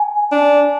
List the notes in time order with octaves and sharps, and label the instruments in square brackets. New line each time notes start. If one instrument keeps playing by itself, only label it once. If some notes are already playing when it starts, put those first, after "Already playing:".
Already playing: [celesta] G#5
[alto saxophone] D4